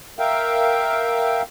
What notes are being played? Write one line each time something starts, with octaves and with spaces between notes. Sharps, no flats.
A#4 E5 F5 G5